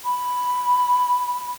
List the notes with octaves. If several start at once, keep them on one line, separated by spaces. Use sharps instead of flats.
B5